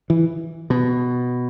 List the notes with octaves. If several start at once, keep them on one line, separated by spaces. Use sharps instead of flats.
E3
B2